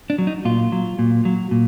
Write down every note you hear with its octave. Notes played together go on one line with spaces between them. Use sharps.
D4
F#3
D#4
A#2 F4
F#3
A#2
F#3
A#2